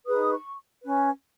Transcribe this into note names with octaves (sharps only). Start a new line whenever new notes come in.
D#4 G#4 B4 D#6
C#6
C#4 B4